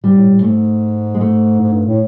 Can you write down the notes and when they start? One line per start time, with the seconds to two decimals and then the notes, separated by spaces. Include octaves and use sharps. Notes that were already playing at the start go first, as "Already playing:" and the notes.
0.04 G#2 G3
0.17 A2
0.30 A2
0.42 G#2 A3
1.14 G#3
1.21 A3
1.61 G#2
1.73 G2
1.86 A2